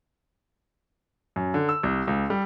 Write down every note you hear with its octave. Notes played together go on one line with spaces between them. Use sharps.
F#2
D3
E6
C2
C#2
G3